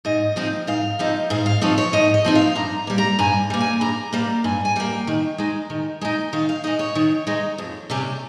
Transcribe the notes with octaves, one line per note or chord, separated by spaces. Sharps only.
G#2 D#5
F3 C4 D#4
G#2 F5
F3 C4 D#4
G#2 F5
F5
F3 C4 D#4 C#5
C#5
G#2 D#5
D#5
F3 C4 D#4
F5
G2 A#5
G3 A#3
A#5
G2 G#5
G3 A#3
G#5
G2 A#5
G3 A#3
G2 G#5
G#5
G3 A#3 G5
D#3
G#3 D#4
D#3
G#3 D#4
D#3 F5
F5
G#3 D#4 D#5
C#5
D#3
G#3 D#4
F2
C3 G3 C#4